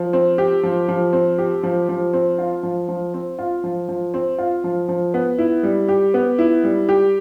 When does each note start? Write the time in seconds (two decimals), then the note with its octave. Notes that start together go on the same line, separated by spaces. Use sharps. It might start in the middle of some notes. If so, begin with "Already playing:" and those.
Already playing: F3
0.13 C4
0.38 G4
0.63 F3
0.88 F3
1.13 C4
1.38 G4
1.63 F3
1.89 F3
2.13 C4
2.39 F4
2.63 F3
2.88 F3
3.14 C4
3.39 F4
3.64 F3
3.89 F3
4.14 C4
4.38 F4
4.64 F3
4.89 F3
5.14 B3
5.39 E4
5.63 G3
5.88 G4
6.14 B3
6.39 E4
6.64 G3
6.89 G4